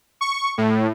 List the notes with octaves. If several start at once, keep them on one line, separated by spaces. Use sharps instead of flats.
C#6
A2